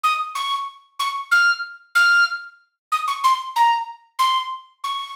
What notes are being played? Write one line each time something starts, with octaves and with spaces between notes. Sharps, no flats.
D#6
C#6
C#6
F6
F6
D#6
C#6
C6
A#5
C6
C#6